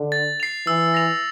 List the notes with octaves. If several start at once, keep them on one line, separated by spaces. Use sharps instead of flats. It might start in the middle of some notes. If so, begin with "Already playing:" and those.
Already playing: D3
A6
C7 F7
E3 E6
A#6 F7